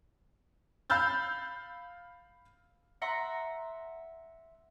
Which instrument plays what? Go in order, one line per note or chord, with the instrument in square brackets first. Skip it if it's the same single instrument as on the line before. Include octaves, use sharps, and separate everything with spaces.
[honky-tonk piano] F5 B5 E6 F6 G6 A6
[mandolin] E5 F#5 A#5 C6